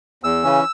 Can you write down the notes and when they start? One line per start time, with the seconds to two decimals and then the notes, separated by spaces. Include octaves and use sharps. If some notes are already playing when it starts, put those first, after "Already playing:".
0.23 E2 E6
0.44 C#3 E3 C#4